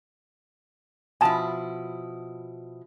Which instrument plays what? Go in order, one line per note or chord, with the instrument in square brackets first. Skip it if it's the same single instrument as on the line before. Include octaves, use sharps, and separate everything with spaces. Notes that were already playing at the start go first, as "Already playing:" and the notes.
[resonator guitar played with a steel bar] B2 F3 E4 [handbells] G#5 A5